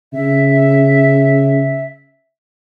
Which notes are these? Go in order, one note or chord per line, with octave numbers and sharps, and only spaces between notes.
C#3 E5